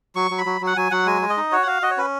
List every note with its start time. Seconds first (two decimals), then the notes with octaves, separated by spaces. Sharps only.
0.16 F#3 C#6
0.31 F#3
0.38 B5
0.46 F#3
0.61 F#3
0.67 F#5
0.77 F#3 G#5
0.91 F#3 F#5
1.06 G#3 G#5
1.22 G#3
1.30 D#5
1.37 D#4
1.52 F#4 C#5
1.63 F#5
1.67 F#4 F5
1.82 F#4 D#5
1.91 C#5
1.97 C#4 B4